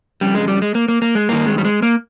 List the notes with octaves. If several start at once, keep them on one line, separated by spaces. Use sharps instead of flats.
F2 C#3 G3
G#3
G3
G#3
A#3
A#3
A#3
G#3
G2 D#3 A#3
G#3
G3
G#3
A#3